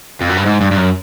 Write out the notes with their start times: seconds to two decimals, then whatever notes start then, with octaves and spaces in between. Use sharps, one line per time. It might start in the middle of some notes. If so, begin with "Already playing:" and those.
0.21 F2
0.29 F#2
0.37 G2
0.46 G#2
0.61 G2
0.71 G2
0.77 F#2